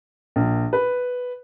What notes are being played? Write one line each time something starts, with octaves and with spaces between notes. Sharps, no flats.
A#1
B4